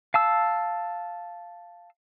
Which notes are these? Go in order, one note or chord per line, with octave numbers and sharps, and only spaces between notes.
F5 A5 E6